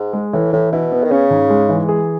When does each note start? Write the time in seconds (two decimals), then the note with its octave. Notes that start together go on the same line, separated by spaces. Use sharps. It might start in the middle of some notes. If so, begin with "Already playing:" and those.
Already playing: G#2
0.13 G#3
0.33 A2 E3
0.53 A2 E3
0.72 B2 E4
0.92 B3
1.03 D#3
1.11 C#3 C#4
1.31 G#2
1.50 G#3
1.69 E3
1.89 G#4